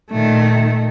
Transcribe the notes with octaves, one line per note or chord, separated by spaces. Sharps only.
A#2 D#3 A3